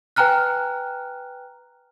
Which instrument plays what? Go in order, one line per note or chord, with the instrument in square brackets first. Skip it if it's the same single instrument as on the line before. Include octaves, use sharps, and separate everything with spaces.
[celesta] B4 G5 G#5 A#5 F6 F#6